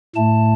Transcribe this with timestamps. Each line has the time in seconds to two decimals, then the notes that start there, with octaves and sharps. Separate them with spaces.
0.15 A2 A3 A5